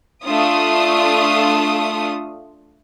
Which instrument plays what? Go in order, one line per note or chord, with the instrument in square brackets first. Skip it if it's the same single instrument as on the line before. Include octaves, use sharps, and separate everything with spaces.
[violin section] A3 D4 F4 D#6